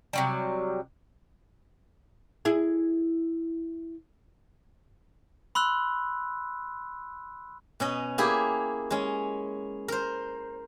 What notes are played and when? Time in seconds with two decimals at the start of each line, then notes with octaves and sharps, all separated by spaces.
0.13 C3 F#3 G3
2.45 E4 G#4
5.55 B5 C6 E6 F#6
7.80 B2 C#4 D#5
8.18 A#3 E4 G4 G#4
8.91 G#3 C#4
9.88 A#4 C5